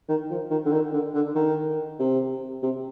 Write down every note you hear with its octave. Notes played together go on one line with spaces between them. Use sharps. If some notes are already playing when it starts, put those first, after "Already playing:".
D#3
F3
D#3
D3
D#3
D3
D3
D#3
C3
C3